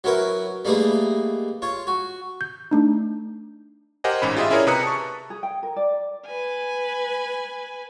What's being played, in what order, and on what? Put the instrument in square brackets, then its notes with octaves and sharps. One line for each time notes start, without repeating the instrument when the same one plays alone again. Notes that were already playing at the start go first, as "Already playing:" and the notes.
[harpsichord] F#3 C#4 E4 A#4 B4
G3 A3 A#3 D#4 G#4 B4
F4 C#5
F#4
[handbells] G6
A3 D4 D#4
[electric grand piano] G4 A#4 C5 D#5 F#5 G#5
A1 G#2 C#4 C#5 B5
F4 G4 G#4 D#5 E5
C#4 E4 G#4 A#4 C#5 D5
C3 B4 A#5 D#6 F#6 C#7
A5 C#6
[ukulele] G#4
G5
A#4
D5
[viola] B4 G#5